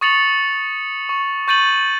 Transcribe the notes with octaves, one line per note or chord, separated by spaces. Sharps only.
C#6 D#6 A6 C#7 F7 F#7
C#6
C#6 G6 A6 D#7 F#7